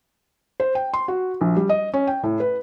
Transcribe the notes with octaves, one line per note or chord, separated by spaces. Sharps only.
C5
G5
C6
F#4
A#1
G3
D#5
C#4
G5
A2
B4